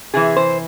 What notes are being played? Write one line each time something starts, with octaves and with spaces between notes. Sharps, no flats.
C3 E3 G#4
C5